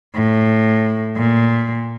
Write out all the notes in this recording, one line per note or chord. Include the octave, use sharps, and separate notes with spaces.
A2
A#2